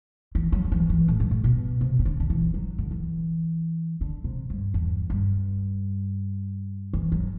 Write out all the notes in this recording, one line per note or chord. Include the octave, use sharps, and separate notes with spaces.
E3
F#3
F#3
E3
E3
A2
G2
A2
B2
C3
C3
D3
D3
E3
F#3
D3
E3
D3
C3
G2
E2
G2
E3
F#3